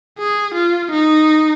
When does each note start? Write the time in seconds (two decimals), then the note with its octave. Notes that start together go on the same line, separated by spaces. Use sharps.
0.19 G#4
0.55 F4
0.92 D#4